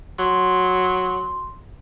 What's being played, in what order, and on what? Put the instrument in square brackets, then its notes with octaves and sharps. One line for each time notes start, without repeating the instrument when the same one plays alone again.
[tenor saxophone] F#3 [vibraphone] C6